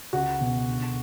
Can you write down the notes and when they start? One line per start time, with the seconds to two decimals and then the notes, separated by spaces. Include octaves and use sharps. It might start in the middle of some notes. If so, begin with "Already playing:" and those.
0.13 C#2 F#4
0.40 B2
0.68 D2